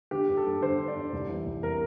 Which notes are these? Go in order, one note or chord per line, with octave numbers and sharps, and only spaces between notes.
D3 G4
G2
A4
G2
D3 C5
D3
D5
G2
C2
E3
C2
C3 A#4